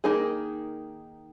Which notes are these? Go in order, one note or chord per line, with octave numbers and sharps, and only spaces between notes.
D#3 A#3 D#4 G#4